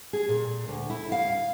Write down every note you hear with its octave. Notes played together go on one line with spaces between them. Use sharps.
G#4
A#2
D2
E4
F5